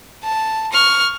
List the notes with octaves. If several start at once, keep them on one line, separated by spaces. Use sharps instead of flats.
A5
C#6 F6